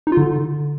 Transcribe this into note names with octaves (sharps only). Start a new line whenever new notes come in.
D#4
F4
D3